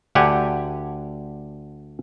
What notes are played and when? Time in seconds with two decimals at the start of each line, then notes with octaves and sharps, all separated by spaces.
0.15 D2 D3 G4 F#5 G#5